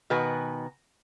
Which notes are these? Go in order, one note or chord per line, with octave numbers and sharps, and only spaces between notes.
B2 D#3 F#4 B4 G#5